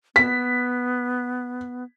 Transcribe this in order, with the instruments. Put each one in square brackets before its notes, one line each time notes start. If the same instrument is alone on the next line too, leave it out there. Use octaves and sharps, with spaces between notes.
[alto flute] B3 [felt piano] B6